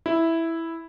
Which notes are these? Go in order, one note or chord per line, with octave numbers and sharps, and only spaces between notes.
E4